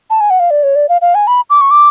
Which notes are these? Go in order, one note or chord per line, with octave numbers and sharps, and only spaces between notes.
A5
G#5
F#5
F5
D5
C#5
D5
F5
F5
G#5
B5
D6
C#6
D6